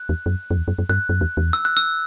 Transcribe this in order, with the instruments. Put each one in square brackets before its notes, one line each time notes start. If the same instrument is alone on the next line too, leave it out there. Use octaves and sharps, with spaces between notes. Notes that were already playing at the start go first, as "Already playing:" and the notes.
Already playing: [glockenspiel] F#6
[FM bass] E2
F#2
F#2
E2
F#2
F#2
[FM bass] G2 [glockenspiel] F#6
[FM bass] F#2
E2
E2
[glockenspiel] E6
F#6
E6